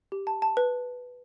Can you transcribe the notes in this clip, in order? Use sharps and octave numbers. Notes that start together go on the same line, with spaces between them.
G4
A5
A5
B4